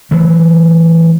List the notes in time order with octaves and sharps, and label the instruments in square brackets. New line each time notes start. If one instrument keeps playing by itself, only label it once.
[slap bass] E3 F#3 A3